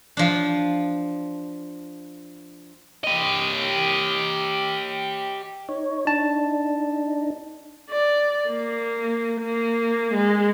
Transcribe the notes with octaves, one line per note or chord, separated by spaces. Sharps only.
F3 D4
G4 D#5
D#4 C#5
D4 D#4 A5
D5
A#3
A#3
G#3